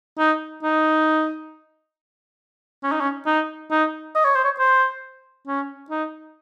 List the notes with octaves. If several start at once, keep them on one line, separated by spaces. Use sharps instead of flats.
D#4
D#4
C#4
D#4
C#4
D#4
D#4
D#5
C#5
C5
C#5
C5
C#4
D#4